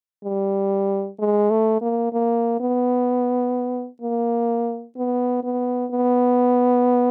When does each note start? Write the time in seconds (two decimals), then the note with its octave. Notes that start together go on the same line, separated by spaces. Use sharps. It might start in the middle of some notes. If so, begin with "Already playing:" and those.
0.25 G3
1.19 G#3
1.51 A3
1.82 A#3
2.13 A#3
2.60 B3
4.02 A#3
4.97 B3
5.43 B3
5.91 B3